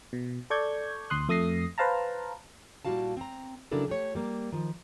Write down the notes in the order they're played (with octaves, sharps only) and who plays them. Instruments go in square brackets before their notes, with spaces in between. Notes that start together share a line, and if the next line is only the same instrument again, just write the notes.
[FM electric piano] B2
A4 D5 C#6 G6 G#6
D2 C6 D#6 F#6
F2 A3 D#6 A#6 C7
B4 C5 F5 A5 A#5
[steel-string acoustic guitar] A#2 G3 E4 F#4 F5 A5
C4 A#5
C#3 F#3 D4 E4 A4 A#4
A3 G4 C#5
G3 A#3
D#3 F3